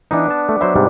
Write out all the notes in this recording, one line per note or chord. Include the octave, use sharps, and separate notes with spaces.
E3 B3 D4 D#4
A5
A3
F#3 C5 E5 B5
G#2 C3 G3